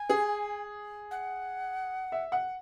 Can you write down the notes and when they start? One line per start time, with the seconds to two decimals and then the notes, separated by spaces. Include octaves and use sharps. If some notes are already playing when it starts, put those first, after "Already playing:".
Already playing: G#5
0.09 G#4
1.11 F#5
2.12 E5
2.32 F#5